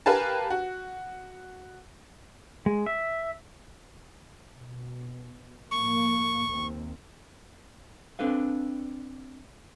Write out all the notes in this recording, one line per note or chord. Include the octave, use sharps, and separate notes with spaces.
G4 A#4 B4 F5 G#5 A5
F#4
G#3
E5
B2
A2 F3 A#3 C#6
D#2 A#3 C4
C4 D4 A4 B4 F5